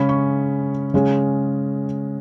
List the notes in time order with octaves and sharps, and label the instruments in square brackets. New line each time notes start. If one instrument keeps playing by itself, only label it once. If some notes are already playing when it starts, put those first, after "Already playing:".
Already playing: [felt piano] C#3 G#3 C#4 B5
C#6
C#3 G#3 C#4